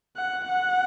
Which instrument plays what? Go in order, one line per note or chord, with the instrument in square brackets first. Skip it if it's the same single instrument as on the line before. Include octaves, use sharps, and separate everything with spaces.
[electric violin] F#5
F#5